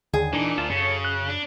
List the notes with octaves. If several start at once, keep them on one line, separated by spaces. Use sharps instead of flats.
D#2 D3 D#3 G#4
A#2 E3 D4 D#4
D2 F4 A5
F#2 C#3 A4 C#5
F#6
D4